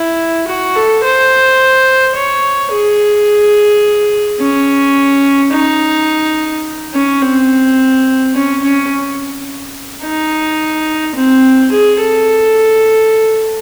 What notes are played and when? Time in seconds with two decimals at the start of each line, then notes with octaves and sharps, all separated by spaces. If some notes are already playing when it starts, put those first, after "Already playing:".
Already playing: E4
0.48 F#4
0.76 A4
1.04 C5
2.16 C#5
2.72 G#4
4.40 C#4
5.53 D#4
6.94 C#4
7.22 C4
8.35 C#4
8.63 C#4
10.03 D#4
11.15 C4
11.71 G#4
12.00 A4